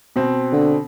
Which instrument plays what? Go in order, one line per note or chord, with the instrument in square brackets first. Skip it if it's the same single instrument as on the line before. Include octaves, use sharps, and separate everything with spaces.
[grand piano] B2 C4
[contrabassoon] D3